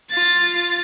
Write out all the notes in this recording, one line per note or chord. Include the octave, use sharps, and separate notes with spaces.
F4 A6